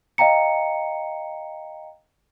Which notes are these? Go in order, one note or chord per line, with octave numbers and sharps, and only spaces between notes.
D#5 F5 G5 A#5 C#7